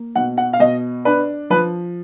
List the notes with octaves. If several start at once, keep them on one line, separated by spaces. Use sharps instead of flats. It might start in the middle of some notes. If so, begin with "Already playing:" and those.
Already playing: A#3
B2 F#5
F#5
F5
B2 D#5
D4 B4
F3 B4